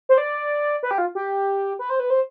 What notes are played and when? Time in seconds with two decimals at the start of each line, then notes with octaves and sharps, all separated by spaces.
0.09 C5
0.18 D5
0.83 B4
0.91 G4
0.98 F4
1.15 G4
1.79 B4
1.90 C5
2.00 B4
2.10 C5